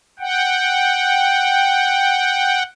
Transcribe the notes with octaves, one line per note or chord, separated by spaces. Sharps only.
F#5 G5